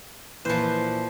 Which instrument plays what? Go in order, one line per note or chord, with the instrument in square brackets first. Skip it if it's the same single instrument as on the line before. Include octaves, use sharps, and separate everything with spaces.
[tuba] A#2 [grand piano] E3 B4 [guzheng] F3 C5